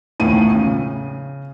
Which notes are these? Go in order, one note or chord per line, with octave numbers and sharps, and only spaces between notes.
E1 C#2 A2 D#3 F3 D#7
C#3